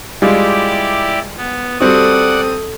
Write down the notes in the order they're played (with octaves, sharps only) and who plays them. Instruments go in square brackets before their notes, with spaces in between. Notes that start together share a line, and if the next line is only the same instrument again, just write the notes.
[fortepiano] G3 G#3 F4 [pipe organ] E4 G4 D5
[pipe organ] B3
[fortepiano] G3 C4 F#4 [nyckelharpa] A4 D#6 [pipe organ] D5 F#5